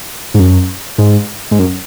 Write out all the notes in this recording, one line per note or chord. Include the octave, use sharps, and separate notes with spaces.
G#2
F#2
G#2
G#2
F#2